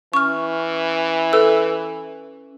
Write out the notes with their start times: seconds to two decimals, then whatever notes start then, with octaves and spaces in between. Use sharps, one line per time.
0.13 E3 C#4 C#6 F6
1.33 A4 B4 E6